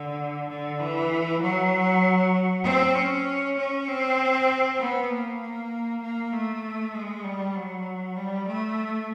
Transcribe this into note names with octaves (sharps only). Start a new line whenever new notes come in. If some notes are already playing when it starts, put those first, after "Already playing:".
Already playing: D3
D3
E3
F#3
C4
C#4
C#4
C4
B3
A#3
A#3
A#3
A3
G#3
G3
F#3
G3
A3